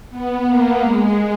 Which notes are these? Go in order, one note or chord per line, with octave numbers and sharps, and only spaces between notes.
B3
A#3
G#3